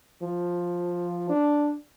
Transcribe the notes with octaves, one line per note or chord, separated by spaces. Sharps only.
F3
D4